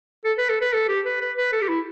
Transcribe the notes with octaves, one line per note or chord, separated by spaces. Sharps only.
A4
B4
A4
B4
A4
G4
B4
B4
B4
A4
G4
E4